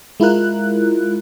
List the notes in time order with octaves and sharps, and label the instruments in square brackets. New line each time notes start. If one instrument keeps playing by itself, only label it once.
[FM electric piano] G#3 E4 F4 A#4 F#6